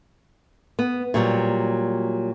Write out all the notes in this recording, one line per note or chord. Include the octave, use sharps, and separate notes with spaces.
B3
A#2 F#3 G3